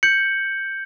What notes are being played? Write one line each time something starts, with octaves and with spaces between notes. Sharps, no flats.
G6 C#7 F#7